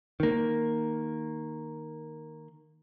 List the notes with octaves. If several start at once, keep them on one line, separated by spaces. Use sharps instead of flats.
D#3 A#3